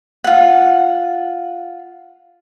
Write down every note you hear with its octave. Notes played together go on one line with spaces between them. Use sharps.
F4 F#5